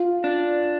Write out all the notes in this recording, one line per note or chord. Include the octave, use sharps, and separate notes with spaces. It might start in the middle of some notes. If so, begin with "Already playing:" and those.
Already playing: F4
D4